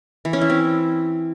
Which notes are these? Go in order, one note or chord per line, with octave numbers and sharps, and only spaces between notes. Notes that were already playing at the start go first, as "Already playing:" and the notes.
E3
C#4
E4
C4